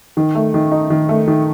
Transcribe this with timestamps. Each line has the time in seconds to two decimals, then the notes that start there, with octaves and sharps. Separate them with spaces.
0.17 D#3
0.35 A3
0.54 D#3
0.72 D#4
0.90 D#3
1.09 A3
1.28 D#3